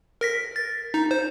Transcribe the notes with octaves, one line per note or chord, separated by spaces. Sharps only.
A#4 A#6 B6
A6
D#4
C5